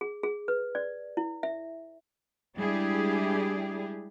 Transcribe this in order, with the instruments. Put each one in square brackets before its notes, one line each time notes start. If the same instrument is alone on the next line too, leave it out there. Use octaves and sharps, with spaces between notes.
[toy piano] G#4
G#4
B4
D5
E4
E5
[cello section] G3 G#3 D4 E4 G4 G#4